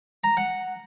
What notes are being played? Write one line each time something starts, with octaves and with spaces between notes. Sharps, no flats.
A#5
F#5